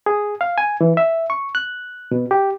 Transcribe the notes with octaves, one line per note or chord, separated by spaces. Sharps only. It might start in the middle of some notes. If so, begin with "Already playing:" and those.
G#4
F5
G#5
E3
E5
C#6
F#6
B2
G4